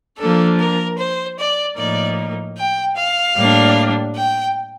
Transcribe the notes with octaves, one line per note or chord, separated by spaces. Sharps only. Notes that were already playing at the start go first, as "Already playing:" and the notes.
F3 A#3 D4 A4
A#4
C5
D5
A2 F3 A#3 D#4 D5
G5
F5
A2 G3 A#3 D4
G5